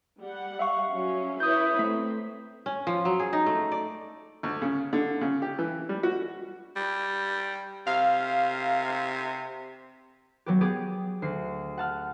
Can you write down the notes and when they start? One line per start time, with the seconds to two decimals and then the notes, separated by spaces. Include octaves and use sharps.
0.22 G3 F#5
0.59 E5 F5 C#6
0.91 F#3 C#4
1.40 E4 B4 C#5 D#6 G6
1.79 A3 C4 B6
2.66 C#4
2.87 F3
3.05 F#3
3.20 G#4
3.33 D#4
3.46 A3
3.72 D5
4.43 D2
4.62 C#3
4.93 D3
5.21 C#3
5.42 G4
5.59 E3
5.89 G3
6.03 F#4
6.76 G3
7.87 C3 F5
10.46 F#3 B3 G4
10.61 B3 G4 G#4
11.22 D2 C7
11.78 F#5 A5 F6